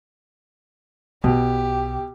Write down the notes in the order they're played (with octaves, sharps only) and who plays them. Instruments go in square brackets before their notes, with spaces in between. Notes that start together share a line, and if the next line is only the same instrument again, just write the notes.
[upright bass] B1 [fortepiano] B2 [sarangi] G4